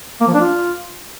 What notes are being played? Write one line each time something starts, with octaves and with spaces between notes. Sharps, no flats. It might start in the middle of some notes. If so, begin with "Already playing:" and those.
A#3
F3
D4
F4